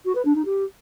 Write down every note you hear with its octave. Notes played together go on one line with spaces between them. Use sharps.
F#4
B4
D4
D#4
G4